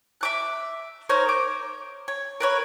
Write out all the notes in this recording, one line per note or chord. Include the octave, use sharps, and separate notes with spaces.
E5 D6 F#6
D#4 A#4 C5 C#5
D6
C#5
A#4 B4 C#5